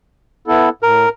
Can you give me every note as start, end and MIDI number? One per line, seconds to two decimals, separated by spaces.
0.48 0.69 59
0.48 0.69 64
0.48 0.69 69
0.83 1.06 45
0.83 1.09 70